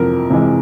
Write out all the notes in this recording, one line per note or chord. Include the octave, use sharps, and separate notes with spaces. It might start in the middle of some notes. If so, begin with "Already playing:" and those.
Already playing: F2 C3 E3 A#4
C3 E3 G#3